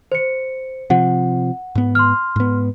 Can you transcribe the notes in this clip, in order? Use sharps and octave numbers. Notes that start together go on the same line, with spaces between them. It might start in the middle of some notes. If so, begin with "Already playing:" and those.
C5 C#7
C3 F3 F#5
G#2 B3
C6 F6
G#2 B3